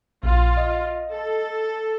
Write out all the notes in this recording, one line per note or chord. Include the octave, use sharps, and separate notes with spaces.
A#1 F4
D#5
A4